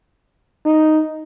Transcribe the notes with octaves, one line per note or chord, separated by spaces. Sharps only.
D#4